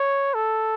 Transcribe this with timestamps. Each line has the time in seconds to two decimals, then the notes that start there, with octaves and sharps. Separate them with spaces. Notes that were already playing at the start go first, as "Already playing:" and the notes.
Already playing: C#5
0.34 A4